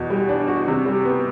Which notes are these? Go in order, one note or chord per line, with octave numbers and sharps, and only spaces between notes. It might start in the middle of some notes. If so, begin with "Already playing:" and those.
Already playing: E2 B2
G3
D4
F#4
C3
G3
B3